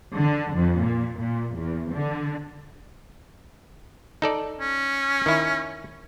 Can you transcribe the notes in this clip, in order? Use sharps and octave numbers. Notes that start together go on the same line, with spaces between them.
D3
F2
A#2
A#2
E2
D3
D#4 A4 D5
C#4
D#3 E4